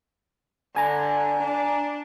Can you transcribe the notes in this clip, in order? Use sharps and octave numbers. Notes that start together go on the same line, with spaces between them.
D3 G#5 A#5
D4